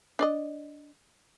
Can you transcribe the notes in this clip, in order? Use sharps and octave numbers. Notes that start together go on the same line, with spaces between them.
D4 D5 D#5